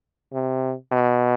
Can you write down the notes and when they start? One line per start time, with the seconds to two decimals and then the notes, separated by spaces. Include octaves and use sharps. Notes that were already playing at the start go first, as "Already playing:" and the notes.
0.33 C3
0.92 B2